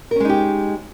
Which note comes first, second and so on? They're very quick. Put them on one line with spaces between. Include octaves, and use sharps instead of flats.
A#4 C#4 G#3 D#4 G4